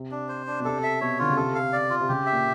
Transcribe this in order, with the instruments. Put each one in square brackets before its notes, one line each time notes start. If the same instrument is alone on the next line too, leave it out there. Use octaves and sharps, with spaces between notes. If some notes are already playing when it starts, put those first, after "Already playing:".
Already playing: [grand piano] C3
[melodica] D4
C5
D4
[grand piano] B2
[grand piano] C3 [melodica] A4
[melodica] E5
[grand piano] B2 [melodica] C#5
[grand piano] D3 [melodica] F4
[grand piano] C#3
[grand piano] C3 [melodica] A4
[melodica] F5
D5
F4
[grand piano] C3
[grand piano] C#3 [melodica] G4
[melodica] E5
[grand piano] A#2